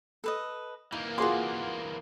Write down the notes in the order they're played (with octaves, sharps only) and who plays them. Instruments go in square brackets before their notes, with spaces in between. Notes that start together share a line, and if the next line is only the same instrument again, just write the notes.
[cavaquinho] A4 B4 D#5
[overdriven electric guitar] E3 A#3 [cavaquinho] D#4
[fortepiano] F4 G#4 C6 [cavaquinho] F#4 D6